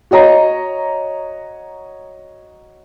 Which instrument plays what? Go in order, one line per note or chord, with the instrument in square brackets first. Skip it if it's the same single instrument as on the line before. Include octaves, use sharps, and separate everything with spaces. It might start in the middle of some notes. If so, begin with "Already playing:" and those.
[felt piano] F#4 C#5 D#5 A#5